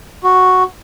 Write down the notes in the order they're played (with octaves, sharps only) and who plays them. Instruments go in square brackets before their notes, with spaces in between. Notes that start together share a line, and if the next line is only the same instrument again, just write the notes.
[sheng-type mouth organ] F#4